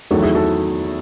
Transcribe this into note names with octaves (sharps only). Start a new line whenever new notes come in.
E2 D#3 F#3 A3 F#4 A4
E4 G#4
F#4 A4